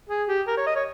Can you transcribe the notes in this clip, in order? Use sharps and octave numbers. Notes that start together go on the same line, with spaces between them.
G#4
G4
A#4
C#5
D#5
C#5